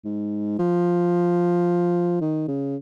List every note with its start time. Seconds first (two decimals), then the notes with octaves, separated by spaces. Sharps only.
0.04 G#2
0.59 F3
2.21 D#3
2.48 C#3